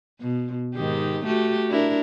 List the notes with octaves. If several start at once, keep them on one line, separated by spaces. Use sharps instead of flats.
B2
G#2 D#3 G4
A3 F#4 G4
D4 E4 A#4